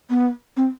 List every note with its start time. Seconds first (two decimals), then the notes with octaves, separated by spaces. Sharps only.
0.10 B3
0.57 C4